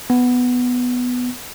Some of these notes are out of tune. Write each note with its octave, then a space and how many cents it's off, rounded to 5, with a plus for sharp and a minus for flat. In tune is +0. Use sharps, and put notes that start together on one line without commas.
B3 +5